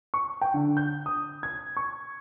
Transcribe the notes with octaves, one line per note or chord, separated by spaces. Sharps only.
C#6
G5
D3
G6
D#6
G#6
C#6